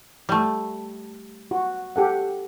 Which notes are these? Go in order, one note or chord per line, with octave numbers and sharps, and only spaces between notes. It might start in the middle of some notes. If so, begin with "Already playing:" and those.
G3 A3
F#4
G4 A4 F#5